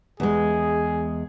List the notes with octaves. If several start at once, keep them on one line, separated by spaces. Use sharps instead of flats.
E2 G#3 G#4